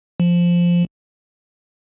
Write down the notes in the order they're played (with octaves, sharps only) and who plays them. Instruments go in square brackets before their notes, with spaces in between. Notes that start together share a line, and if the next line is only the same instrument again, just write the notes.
[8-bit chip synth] F3